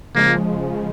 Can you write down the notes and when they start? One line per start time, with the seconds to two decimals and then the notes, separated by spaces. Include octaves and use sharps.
0.15 C#3 F3 G#3 A#3
0.74 C#3 F3